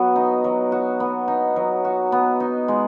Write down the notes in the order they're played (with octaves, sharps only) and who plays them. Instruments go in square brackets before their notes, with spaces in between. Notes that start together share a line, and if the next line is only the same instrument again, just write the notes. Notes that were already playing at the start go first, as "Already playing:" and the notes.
Already playing: [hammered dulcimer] F#3 B3 F#4
D#4
F#3
F#4
B3
D#4
F#3
F#4
B3
D#4
G#3